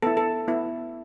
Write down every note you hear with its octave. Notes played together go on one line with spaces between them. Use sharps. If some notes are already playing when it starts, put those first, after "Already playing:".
B3 E4 A4
A4
B3 E4